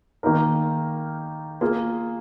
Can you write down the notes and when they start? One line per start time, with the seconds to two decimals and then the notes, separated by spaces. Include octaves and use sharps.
0.23 D#3 A#3 D#4 A#4
1.61 A#3 F4 G#4